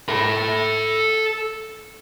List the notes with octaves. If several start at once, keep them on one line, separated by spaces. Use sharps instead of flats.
A4 B5